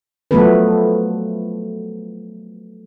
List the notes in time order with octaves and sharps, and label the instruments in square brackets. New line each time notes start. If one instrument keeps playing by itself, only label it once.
[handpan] F3 F#3 A3 B3 A4 B4